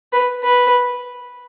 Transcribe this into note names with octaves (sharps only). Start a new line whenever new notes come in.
B4
B4